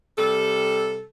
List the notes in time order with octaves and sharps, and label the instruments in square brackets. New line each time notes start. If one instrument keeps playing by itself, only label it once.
[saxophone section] C3 G3 A4